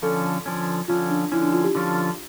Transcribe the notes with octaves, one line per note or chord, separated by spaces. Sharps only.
D3 F3 C#4 A4
D3 F3 C#4
D3 F3 C#4 F4
D4
D3 F3 C#4 E4
D4
F4
G4
D3 F3 C#4 F4